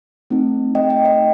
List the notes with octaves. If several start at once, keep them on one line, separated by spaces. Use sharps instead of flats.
A3 C4 D#4
A3 D#4 G4 D#5 G5
D#5 G5
D#5 G5